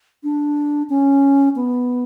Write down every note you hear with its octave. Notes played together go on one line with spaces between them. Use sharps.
D4
C#4
B3